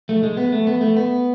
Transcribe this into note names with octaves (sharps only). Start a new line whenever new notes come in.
A3
G#3
B3
A3
B3
A3
B3